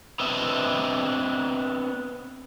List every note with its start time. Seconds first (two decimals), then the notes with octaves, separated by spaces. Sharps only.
0.20 B3 C4 D4 D#5 E5